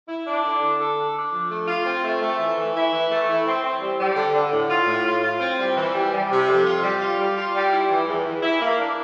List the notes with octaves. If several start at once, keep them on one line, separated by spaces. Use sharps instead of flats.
E4
D4
D3
D3
A4
D4
D4
F3
A3
F4
C4
A3
A3
E3
E3
E4
E3
A3
E4
C4
C4
G3
G3
D3
D3
A2
F4
A2
F4
F4
C4
G3
E3
G3
G3
C3
F2
F4
G3
F4
G3
F4
G3
E4
E3
E2
E3
E4
A#3
D4